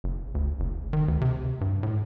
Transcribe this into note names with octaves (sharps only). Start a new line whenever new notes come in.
F#1
D2
F#1
D#3
D2
C3
G2
A2